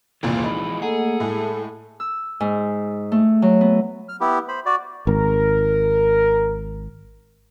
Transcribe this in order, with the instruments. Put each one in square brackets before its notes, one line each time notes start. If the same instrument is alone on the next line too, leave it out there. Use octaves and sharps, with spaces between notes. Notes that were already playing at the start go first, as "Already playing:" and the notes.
[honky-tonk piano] F1 C#2 A#2 [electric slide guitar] E3 F3 G#3
[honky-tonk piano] D#4 [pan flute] B5
[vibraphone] A3 A#3 F#5 [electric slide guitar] G#4 [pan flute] A4
[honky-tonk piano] A2 G#3 [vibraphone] A5
[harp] E6
G#2
A3
F#3
B3
[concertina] F6
B3 E4 G4
C5 B5
F#4 D5
[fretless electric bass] G#1 [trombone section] A#4